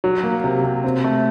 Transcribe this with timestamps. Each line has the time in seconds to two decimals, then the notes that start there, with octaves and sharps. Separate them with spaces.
0.04 F#3
0.24 A#3
0.44 C3
0.64 C3
0.84 C4
1.04 A3